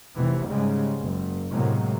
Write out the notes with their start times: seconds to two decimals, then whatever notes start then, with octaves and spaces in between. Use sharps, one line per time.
0.17 F1 C3 E3
0.48 G#2 C#3 G3 G#3
1.02 F#1
1.50 A2 C3 F#3 G#3 A#3